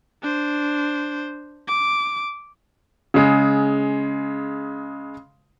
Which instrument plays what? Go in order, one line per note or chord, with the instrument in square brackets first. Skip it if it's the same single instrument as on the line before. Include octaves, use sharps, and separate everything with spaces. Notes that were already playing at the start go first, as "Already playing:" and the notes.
[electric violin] D4 C5
D6
[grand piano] C#3 G#3